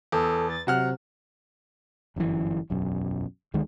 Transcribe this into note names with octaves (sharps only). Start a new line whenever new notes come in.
E2 A4
A6
C3 F#3 F#5 F6
G1 F#2 B2 E3
E1 B1 F#2
D2 D#3 G#3